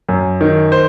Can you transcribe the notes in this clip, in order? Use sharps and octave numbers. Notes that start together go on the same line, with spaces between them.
F#2
D#3
C5